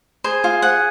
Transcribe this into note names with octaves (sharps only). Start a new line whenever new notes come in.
G#4 C5 G#5
F4
F#5